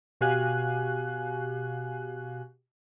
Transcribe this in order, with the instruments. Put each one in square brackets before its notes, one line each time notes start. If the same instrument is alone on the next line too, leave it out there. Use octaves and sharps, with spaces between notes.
[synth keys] B2 F#4 G4 F5 G#5 F#6